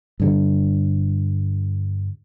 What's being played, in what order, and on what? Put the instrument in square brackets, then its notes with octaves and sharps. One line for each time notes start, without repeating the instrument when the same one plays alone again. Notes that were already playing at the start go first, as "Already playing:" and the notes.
[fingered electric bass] G2 D3 G3